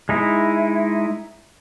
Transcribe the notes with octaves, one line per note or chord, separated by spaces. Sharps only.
G#3 D#4 E4